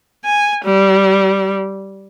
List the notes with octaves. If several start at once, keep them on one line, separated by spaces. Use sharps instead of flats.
G#5
G3